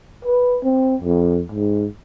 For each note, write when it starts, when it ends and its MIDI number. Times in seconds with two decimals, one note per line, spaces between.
0.25 0.58 71
0.64 0.96 60
1.02 1.42 41
1.52 1.86 44